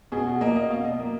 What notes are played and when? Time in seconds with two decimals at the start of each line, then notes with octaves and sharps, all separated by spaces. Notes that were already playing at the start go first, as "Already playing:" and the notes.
0.12 B2 G#4
0.27 F#4
0.41 A#3 D#5
0.56 D#5
0.70 B2 F5
0.85 D#5
0.99 A#3